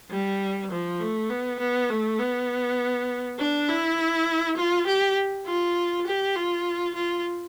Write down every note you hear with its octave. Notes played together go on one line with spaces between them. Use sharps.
G3
F3
A3
B3
B3
A3
B3
D4
E4
F4
G4
F4
G4
F4
F4